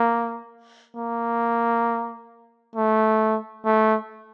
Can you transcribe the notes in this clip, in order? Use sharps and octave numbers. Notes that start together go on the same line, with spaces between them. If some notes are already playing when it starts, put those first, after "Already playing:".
Already playing: A#3
A#3
A3
A3